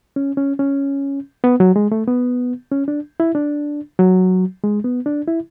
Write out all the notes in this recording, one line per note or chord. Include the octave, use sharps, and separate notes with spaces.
C#4
C#4
C#4
B3
F#3
G#3
A3
B3
C#4
D4
E4
D4
F#3
G#3
B3
D4
E4